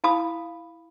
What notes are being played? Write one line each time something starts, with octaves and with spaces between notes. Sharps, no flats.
E4 F5 A5 B5 D#6